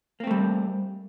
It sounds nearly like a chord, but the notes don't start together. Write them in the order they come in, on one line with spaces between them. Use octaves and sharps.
A#3 C4 A3 G3